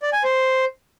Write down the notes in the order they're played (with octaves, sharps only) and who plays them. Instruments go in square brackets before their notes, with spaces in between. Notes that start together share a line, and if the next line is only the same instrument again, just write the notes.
[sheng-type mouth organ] D5
G#5
C5